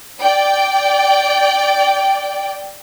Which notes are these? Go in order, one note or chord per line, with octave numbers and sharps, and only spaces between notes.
D5 G5